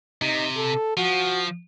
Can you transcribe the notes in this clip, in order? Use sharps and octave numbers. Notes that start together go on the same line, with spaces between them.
C3 D#4
A4
F3 F#4